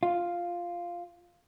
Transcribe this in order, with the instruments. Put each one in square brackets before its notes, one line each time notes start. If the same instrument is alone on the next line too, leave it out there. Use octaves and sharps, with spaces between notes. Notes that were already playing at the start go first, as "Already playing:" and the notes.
[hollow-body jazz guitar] F4